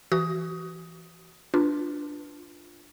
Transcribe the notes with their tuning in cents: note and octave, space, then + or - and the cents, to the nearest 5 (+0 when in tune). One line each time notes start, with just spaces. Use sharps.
E3 +15 F#4 +25 D#6 +15
D4 +0 F4 +0 B4 +0